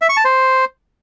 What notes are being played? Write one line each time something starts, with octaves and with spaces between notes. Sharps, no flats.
E5
C#6
A5
C5